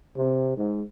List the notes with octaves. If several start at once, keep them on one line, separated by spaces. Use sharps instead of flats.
C3
G#2